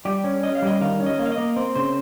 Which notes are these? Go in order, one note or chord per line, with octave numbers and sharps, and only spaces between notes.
G3 G4
C#4
C#4 D#5
F5
G3 D#5
D#3 F5
C#4
D#5
A#3
F5
D#5
A#3
C4
C#3 C5